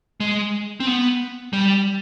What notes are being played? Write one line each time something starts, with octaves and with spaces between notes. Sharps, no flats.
G#3
C4
B3
G3